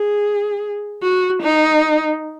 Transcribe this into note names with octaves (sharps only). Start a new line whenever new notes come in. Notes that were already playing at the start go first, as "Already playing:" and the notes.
Already playing: G#4
F#4
D#4